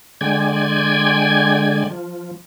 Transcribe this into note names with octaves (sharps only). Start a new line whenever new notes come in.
D3 G#3 D5 G5 G#5 G#6
F3